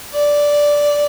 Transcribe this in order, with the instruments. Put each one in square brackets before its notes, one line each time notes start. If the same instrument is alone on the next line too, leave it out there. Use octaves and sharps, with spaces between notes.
[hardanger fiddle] D5